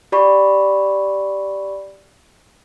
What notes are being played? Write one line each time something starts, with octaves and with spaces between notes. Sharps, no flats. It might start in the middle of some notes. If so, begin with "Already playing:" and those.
G4 D5 B5 C#6